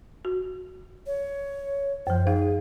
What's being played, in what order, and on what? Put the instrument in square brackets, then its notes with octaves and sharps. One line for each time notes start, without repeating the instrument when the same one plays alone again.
[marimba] F#4
[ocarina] C#5
[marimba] F#2 F3 [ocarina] C5
[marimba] D#4 F5 [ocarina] G#4